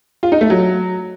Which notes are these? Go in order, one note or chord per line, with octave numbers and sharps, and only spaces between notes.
F4
D#4
A3
F#3